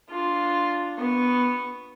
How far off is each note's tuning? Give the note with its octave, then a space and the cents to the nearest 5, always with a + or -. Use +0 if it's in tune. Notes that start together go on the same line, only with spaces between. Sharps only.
D4 +0 F4 +0
B3 +0 C#6 -10